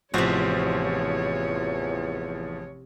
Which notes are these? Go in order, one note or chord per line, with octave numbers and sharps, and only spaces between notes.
A1 E2 C3 F3 F#4 C5 C#5